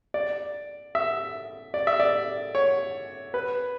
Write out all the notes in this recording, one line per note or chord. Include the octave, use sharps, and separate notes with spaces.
D5
E5
D5
E5
D5
C#5
B4